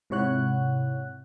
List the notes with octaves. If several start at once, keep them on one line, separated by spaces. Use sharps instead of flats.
G#2 C3 E4 C#5 F#5 F#6